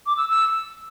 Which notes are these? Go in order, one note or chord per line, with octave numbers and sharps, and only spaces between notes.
D6
E6
E6